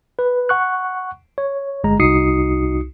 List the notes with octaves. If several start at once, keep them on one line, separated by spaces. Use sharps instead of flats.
B4
F#5 C#6 F#6
C#5
G1 G#3 A#5
C2 D#4 F#4 D#6 C7 C#7